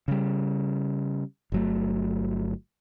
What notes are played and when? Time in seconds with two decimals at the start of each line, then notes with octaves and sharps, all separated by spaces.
0.08 C#3 G3
1.52 G1 F#3 A3